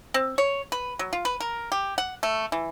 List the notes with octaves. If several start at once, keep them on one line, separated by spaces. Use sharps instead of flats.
C4
C#5
B4
F#3
F4
B4
A#4
G4
F#5
A3
E3